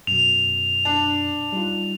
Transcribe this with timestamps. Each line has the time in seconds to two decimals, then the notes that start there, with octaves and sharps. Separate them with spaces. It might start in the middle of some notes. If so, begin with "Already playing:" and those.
0.07 F#2 B2 F7
0.85 D4
1.52 G3 D#4 F4